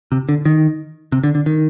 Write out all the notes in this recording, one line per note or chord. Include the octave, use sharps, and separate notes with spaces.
C3
D3
D#3
C3
D3
D3
D#3